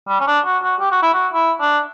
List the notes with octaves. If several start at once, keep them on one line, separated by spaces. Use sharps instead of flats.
G3
C#4
D4
F#4
F#4
G4
F#4
E4
F#4
E4
D4